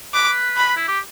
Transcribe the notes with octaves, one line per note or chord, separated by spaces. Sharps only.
B4 D6
B5
E4
G4